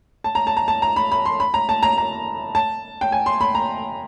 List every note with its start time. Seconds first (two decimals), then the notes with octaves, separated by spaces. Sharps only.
0.24 A5
0.35 A#5
0.47 A5
0.57 A#5
0.68 A5
0.82 A#5
0.96 B5
1.12 B5
1.25 C6
1.40 B5
1.54 A#5
1.69 A5
1.83 A#5
1.98 A#5
2.55 A5
3.01 G5
3.12 G#5
3.26 C6
3.41 B5
3.55 A#5